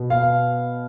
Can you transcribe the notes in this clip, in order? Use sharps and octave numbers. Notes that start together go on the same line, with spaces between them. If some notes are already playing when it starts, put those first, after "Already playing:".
Already playing: B2
F5